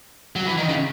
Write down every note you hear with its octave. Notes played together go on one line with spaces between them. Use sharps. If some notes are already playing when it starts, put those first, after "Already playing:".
F#3
E3
D#3
C#3